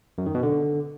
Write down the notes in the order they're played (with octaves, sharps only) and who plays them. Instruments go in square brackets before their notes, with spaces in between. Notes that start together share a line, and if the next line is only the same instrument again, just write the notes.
[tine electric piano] F#2
D#3
B2
D3